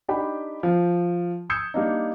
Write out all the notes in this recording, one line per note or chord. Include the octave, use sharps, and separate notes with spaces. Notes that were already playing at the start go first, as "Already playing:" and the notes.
D4 D#4 G4 G5 B5
F3
D#6 E6 G6 G#6 C#7
G3 A#3 D4 D#4